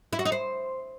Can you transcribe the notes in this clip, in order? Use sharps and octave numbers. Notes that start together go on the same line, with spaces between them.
E4
F#4
D#4
C5